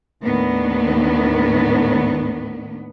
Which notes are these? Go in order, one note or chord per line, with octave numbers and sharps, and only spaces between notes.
D#2 A2 D#3 B3 D4